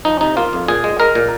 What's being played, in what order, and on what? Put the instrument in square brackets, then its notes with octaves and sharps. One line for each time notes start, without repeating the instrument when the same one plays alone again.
[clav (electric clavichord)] F3 D#4
C3 D#4
A#3 F4
F2
A#2 G#4
G#3
G#3 A#4
A#2